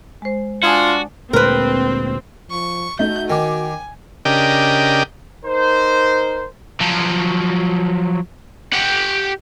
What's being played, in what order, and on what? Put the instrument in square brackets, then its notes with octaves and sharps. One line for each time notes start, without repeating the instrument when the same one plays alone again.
[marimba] G#3 C5
[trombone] D4 [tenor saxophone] F4 [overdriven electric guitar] F#4 [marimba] G#5 D#6 G#6
[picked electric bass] D2 A#2 G#3 [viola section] C4 [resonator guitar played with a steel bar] A#4 B4
[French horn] F3 [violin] C#6
[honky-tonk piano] A3 D#4 [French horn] F#4 [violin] G6
[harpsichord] D#3 [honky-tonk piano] G5 D6 [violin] G#5
[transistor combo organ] C#3 D4 G4 A#4 D#5 G5
[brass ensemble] D#4 A#4 C5
[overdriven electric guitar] F3 F#3
G4 F#5